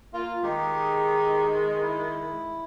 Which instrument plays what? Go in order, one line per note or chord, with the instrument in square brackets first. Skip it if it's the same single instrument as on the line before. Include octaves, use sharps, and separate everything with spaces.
[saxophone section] A#3 F4
[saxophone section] D#3 G#3 [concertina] D#4 G4
[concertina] E4